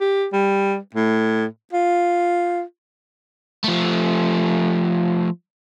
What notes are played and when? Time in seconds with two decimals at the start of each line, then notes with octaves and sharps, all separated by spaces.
0.01 G4
0.33 G3
0.95 A2
1.73 F4
3.64 F3 A3